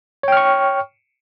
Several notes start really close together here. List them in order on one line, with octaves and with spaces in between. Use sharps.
C#5 G5 F6 C#6